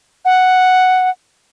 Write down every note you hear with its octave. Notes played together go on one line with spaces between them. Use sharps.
F#5